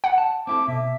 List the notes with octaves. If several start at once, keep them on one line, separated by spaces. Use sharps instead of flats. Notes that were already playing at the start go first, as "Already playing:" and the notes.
F#5
A5
C4 E4 A4 D6
B2 E5